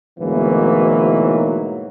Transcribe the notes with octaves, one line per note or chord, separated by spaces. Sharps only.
D2 G#2 B2 E3 F#3 A#3